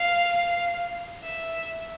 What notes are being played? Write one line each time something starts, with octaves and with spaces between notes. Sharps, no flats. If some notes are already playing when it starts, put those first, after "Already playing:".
Already playing: F5
E5